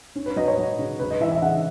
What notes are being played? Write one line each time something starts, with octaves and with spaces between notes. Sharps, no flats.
C#4
B4
F#3 D#5
C#5
F#3
C#3
C#3 B4
D#5
E3 E5
E5
C#3 F#5